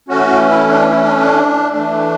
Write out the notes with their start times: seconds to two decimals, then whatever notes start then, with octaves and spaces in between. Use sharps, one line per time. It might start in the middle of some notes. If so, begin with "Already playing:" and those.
0.09 E3 A3 C#4 F#4
0.49 E4
0.70 D4
0.90 E4
1.04 D4
1.18 D4
1.72 E3 A3 D4